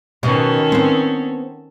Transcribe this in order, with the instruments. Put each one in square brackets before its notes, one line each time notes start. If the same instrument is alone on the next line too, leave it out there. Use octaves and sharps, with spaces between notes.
[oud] B2 [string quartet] D#3 C#4 A4
[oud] B3 C4